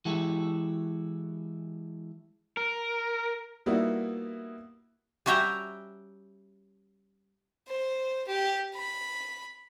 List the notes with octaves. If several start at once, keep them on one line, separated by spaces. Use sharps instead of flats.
E3 G#3 E4 F#4 G4 A4
A#4
G3 A#3 B3 D#4 E4 F#4
G3 C#4 F#4 E5 G5 A#5
C5
G4
B5